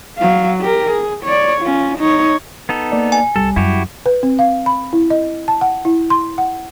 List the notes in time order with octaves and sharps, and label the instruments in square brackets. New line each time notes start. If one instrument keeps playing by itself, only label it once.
[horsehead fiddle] F#3 F5
G4 A#4
G#4
C#5 D5
C#4 F4
D#4 C#5
[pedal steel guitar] B3 D#4 A4
[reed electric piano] A#3 D5
[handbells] G#5
[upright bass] C2 [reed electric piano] G3 [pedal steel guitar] A4
[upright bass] F#2 [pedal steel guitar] E4 F#4 G4
[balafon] B4
C4
F5
B5
E4
D#5
A5
F#5
E4
C6
F#5